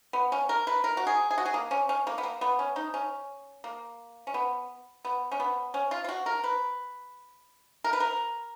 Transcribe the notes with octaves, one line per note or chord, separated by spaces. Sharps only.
B3
C#4
A#4
B4
A#4
F#4
G#4
G#4
F#4
G#4
A#3
C#4
C#4
A#3
B3
A#3
B3
C#4
D#4
C#4
A#3
C#4
B3
B3
C#4
B3
C#4
F4
F4
F#4
A#4
B4
A#4
B4
A#4